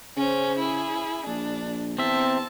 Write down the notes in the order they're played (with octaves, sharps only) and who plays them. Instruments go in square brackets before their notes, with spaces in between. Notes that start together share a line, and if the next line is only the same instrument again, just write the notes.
[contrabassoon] C#3 [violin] C#4 C5
[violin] E4 G#4
[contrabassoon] A#1 [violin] D4
[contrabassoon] E2 [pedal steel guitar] C4 E5 [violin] A5